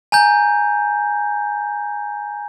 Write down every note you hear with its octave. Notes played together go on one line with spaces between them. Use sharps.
G#5 A#5 G6